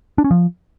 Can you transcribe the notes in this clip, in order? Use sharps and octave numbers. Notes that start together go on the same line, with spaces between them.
D4
C#4
F3